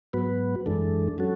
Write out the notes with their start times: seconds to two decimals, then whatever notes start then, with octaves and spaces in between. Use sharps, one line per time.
0.13 G#2 F#3 B3 F#4 B4
0.66 F#2 E3 G#3 D4 A4
1.18 F#3 C#4 F#4 A4